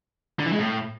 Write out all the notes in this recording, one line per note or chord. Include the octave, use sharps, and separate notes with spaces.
D3
E3
G#3
A2